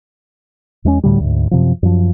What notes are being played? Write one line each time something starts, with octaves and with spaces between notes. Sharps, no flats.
E2 G#3 A#3 C#4
D2 A2 D3 G3
D2 G#2
F#2 C3 F3
F#2 F3